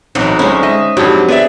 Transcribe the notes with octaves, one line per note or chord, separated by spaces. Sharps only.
B1 E3 F#3 C4 D#4
D3 G#3 C#4 C5
D#5 E5
F2 G#2 F#3 C4 D4 G4
B3 G#4 D5 E5